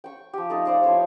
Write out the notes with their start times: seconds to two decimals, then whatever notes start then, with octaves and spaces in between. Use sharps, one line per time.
0.04 G5 C#6
0.33 F3 G4
0.50 A3 D#4 A4
0.65 C5 D5 F5
0.84 F3 E4 C#5 E6